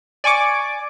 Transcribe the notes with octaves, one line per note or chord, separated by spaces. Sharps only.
D5 G#5 C#6 D6